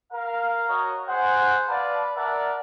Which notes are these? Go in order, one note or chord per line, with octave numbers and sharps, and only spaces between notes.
A#4 F5
F#4 A#4 C#5 D#5 A#5
G#4 C5 F#5
B4 D5 F5 A5
A#4 D5 E5 F#5 A5